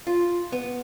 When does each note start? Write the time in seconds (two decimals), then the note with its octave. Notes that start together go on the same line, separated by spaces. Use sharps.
0.07 F4
0.52 B3